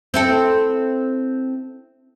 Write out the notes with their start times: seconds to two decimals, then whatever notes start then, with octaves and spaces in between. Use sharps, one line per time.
0.14 C4 E4 A4